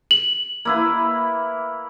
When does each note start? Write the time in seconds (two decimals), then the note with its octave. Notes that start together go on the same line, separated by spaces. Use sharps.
0.11 F#7
0.65 A#3 E4 B4